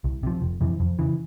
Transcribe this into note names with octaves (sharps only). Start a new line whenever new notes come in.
C2
C3 F3
F1
F2 C3 E3
F2
C#3 E3